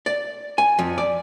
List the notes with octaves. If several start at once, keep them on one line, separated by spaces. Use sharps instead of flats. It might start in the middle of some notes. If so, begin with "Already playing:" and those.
D5
G#5
F2
D5